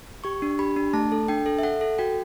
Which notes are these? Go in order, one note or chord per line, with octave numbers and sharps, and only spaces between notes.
G4 C#6
D4
G4 B5
D4
A3 A5
A4
D4 G5
A4
E5
A4 F#5
A4
F#4 G5